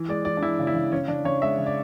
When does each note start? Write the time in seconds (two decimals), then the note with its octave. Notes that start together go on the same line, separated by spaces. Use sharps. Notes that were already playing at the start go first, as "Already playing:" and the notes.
Already playing: E3
0.09 G#3 D5
0.25 E3 D5
0.37 D4
0.43 E3 E4
0.59 C#3
0.67 E4
0.75 C#3
0.92 C#3 C#4
1.08 C#3 D4
1.25 C#3 C#5
1.42 G#3 E5
1.58 C#3
1.66 D5